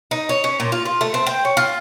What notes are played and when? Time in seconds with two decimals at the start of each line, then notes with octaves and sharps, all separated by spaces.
0.11 D#4
0.29 C#5
0.44 C#4
0.60 A#2
0.72 F4
0.86 F4
1.01 A3
1.14 C4
1.26 G5
1.45 C#5
1.57 F4